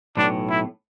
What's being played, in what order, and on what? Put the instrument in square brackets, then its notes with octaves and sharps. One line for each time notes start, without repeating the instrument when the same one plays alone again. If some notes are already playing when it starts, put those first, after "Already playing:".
[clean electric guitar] B1 A2 E3 [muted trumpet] D4
[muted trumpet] E4